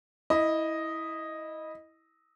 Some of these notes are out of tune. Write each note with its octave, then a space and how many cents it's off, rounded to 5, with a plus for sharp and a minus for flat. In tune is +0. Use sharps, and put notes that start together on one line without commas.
E4 -15 D#5 +0